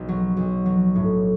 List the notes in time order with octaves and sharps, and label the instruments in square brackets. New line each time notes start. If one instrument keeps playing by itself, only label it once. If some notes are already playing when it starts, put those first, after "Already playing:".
Already playing: [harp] B1
F#3
B1
F#3
A2